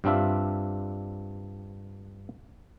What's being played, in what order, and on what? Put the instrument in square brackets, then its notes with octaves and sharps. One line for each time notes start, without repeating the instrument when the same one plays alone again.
[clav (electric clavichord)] G2 G3 C4 D4 F4 E5